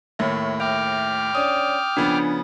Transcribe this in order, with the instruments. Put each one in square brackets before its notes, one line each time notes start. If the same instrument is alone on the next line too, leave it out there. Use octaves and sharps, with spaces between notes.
[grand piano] D#2 A2 C#5 [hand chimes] E5
[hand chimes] E5 [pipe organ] G5 D6 F6
[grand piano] C#4 D4 [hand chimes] D#6
[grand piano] C#3 F3 B3 [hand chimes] D4